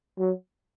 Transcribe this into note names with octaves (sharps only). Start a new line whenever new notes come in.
F#3